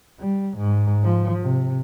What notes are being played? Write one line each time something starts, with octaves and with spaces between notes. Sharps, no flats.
G3
G#2
F3
C3